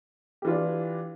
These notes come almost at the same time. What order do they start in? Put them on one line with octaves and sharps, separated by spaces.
G4 E3 F4 D4